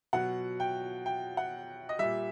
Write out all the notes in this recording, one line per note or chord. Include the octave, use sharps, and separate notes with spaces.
B2 F#3 F#5
G5
G5
F#5
D#5
A#2 G3 E5